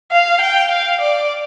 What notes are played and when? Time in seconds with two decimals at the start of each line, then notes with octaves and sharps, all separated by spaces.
0.12 F5
0.41 G5
0.71 F5
1.01 D5